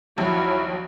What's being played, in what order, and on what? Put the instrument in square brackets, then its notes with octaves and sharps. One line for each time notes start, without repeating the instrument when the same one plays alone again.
[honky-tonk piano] A#1 D#2 A5 [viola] F#3 [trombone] E4